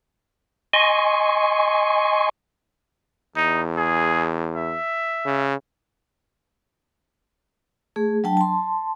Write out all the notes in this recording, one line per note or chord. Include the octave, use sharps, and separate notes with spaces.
D#5 G#5 C6 C#6
E2 D#4
G#4
E5
C#3
A3 G#4
F#3 D4 G5 A5
A5 C6